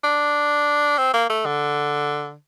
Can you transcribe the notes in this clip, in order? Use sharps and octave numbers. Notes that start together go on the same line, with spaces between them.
D4
C4
A#3
A3
D3